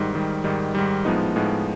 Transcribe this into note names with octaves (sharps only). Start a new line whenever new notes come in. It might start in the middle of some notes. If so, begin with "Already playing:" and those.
Already playing: G#2 D#3 G3
G#2 D#3 G3
G#2 D#3 G3
G#2 D#3 G3
A2 F3 G#3 B3 D#4
A2 F3 G#3 B3 D#4